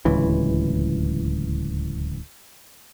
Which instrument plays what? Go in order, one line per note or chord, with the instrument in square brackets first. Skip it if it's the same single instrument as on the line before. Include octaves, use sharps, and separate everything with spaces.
[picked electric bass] D1 C#2 E3